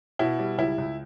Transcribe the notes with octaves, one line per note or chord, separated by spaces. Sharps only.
B2 E4
G3
C#2 E4
C#2